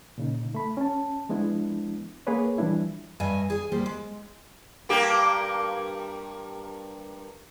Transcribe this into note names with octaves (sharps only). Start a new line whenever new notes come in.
A#2 C#3 D#4
A3 B5
C#4 A5
F3 G#3 B3 D4 E4
A#3 G#4 A#4 B4 C#5
E3 F3 G3 D4 E4
G2 D#5 E5 G#5
G#4 G#5
G3 A#3 G4 C5
G#3
G2 A#3 G4